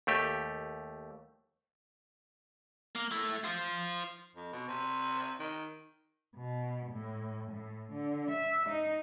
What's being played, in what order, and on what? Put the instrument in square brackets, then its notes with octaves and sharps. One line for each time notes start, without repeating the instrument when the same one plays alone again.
[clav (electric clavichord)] D#2 A3 G4
[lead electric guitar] A#3
A3 E4
F4 C5
[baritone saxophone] F2
B2
C3
D#3
[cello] B2
A2
A2
D3
E5
D#4